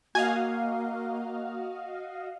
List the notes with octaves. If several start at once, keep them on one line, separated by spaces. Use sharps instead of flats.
A#3 F#4 D#5 F5 G#5